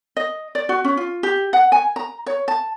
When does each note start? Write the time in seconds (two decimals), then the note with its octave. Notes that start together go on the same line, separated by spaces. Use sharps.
0.17 D#5
0.55 D5
0.69 F#4
0.84 C#4
0.97 F4
1.23 G4
1.53 F#5
1.72 G#5
1.96 A#5
2.26 C#5
2.48 A5